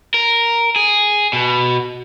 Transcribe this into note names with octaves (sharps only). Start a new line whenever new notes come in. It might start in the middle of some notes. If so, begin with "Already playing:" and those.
A#4
G#4
B2